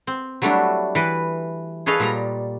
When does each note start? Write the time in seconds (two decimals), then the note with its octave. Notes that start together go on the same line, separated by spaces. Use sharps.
0.07 C4
0.42 F#3 G3 A3 D4 E4 F#4
0.95 E3 B4
1.86 G#4 A4 B4 C#5 D#5 F5
2.00 A#2 G3 A#5